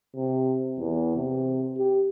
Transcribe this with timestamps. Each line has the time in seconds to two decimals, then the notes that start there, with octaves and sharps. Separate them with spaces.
0.15 C3
0.79 E2
1.16 C3
1.78 G4